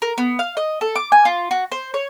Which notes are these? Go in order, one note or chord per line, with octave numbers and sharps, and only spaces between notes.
A#4
B3
F5
D#5
A4
D6
G#5
F4
F#4
C5
C#5